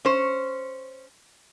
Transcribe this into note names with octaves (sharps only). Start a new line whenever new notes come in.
C#4 C5